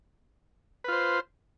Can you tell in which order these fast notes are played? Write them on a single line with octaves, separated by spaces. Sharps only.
B4 F4 C5